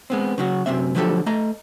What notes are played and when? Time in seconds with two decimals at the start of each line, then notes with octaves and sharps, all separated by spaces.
0.10 G#3 B3 C4
0.38 C#3 F#3 F#4
0.66 F#2 C3 C4 E5
0.95 D3 F3 F#3 B3 G4 A4
1.26 A3 D#5 A#5